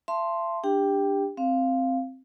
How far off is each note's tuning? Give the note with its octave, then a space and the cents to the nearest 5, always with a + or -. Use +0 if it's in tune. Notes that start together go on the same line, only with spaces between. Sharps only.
E5 +45 A5 +0 C6 +0
D4 +0 G4 +20 G5 +0
C4 +0 F5 -5